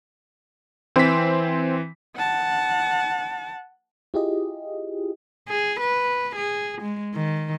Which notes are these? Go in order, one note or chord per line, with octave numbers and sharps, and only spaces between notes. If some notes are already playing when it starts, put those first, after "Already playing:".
E3 C4 B6
F#5 A5
E4 F4 G4 G#4 D#5
G#4
B4
G#4
G#3
D#3